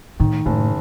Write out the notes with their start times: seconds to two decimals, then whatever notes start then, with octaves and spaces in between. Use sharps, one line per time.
0.20 A2 D#3
0.46 F#1 A2